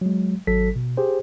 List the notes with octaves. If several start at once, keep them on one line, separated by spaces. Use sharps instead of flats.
F#3 G#3
G#1 F#3 A4 B6
B2
G4 G#4 C5